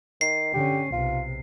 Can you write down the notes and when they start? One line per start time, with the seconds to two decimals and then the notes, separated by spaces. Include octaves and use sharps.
0.21 D#3 C7
0.54 D3 C#4 G4
0.92 B1 C3 F4